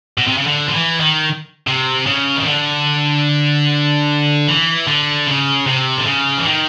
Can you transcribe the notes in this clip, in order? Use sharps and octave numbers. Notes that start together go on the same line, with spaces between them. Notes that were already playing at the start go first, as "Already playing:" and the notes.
B2
C3
C#3
D3
F3
E3
D#3
C3
C#3
D#3
D3
E3
D3
C#3
C3
D3
C#3
E3
D#3